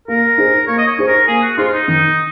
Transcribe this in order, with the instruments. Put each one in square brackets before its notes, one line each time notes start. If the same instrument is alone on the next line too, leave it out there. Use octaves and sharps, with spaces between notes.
[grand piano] A#3 [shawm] A#4
[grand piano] D#4 G#4 C5
[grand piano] A#3 [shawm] C#5
[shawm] D#5
C#5
[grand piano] D#4 G#4 C5
[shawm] A#4
[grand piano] A#3 [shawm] G#4
[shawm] F#4
[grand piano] D#4 G#4 C5 [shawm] F4
[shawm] F4
D#4
[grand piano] D#3 [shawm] D#4